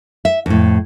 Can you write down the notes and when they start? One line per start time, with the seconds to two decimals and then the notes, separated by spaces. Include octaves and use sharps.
0.25 E5
0.46 F2 A2